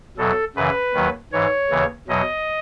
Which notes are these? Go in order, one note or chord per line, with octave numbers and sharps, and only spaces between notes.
E2 B2 F#3 A4
F#2 C#3 E3 B4
D#2 D#3 F#3
G#2 E3 C#5
D#2 C#3 E3
E2 B2 F#3 D#5